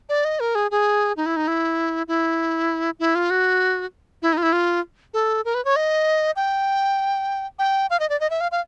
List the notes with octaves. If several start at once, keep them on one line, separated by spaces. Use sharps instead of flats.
D5
D#5
A#4
G#4
G#4
D#4
E4
D#4
E4
E4
E4
F4
F#4
E4
D#4
F4
E4
F4
A4
A#4
B4
C#5
D#5
G5
G5
F5
D#5
D5
D#5
E5
F5
F5